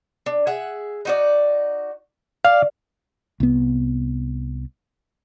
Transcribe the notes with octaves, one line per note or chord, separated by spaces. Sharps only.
D4
G#4 E5 F#5
D#4 F#4 D5
D5 F5
C2 B3